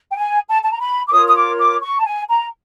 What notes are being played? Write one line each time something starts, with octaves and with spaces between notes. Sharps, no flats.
G5
G#5
A5
A5
A#5
B5
D6
F4 A#4 C#5 D#6
D#6
D6
D6
C#6
A5
G#5
A#5